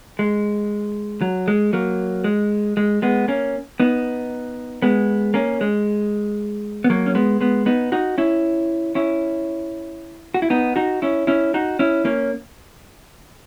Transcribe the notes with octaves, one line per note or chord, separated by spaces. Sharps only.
G#3
F#3
G#3
F#3 A#3
G#3
G#3
G#3 B3
A#3 C#4
B3 D#4
G#3 B3
A#3 C#4
G#3
B3
F#3 A#3
C#4
G#3 B3
G#3 B3
B3 D#4
D#4 F#4
C#4 E4
C#4 E4
F#4
E4
B3 D#4
D#4 F#4
C#4 E4
C#4 E4
D#4 F#4
C#4 E4
A#3 C#4